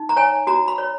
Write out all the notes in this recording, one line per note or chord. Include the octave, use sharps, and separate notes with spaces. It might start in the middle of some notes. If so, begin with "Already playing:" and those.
Already playing: D#4
A#5
C#5 G#5
F#4 A#5
B5
C#5